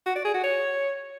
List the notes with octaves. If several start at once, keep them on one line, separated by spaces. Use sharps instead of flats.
F#4
D5
G#4
F#4
C#5